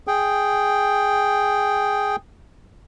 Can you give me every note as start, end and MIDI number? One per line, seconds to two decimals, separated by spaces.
0.07 2.16 68
0.07 2.16 79